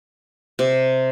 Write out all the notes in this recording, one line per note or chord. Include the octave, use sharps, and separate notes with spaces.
C3